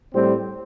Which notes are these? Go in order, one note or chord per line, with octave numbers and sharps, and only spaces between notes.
A2 G3 C4